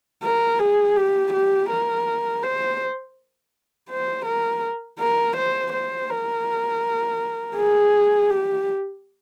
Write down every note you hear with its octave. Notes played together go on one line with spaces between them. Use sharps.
A#4
G#4
G4
G4
A#4
C5
C5
A#4
A#4
C5
C5
A#4
G#4
G4